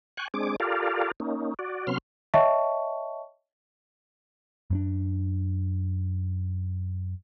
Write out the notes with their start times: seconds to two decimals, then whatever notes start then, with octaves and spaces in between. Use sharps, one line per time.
0.17 G5 G#5 C#6 F#6
0.34 G#3 C4 D4 G#4 D6
0.60 F4 G4 A4 A#4 D5 F5
1.20 A#3 C#4 D#4
1.59 F#4 D5
1.87 C3 F#3 B3 C#4 C6 F6
2.34 C#5 D#5 E5 G5 A5 C#6
4.70 F#2 C4 D4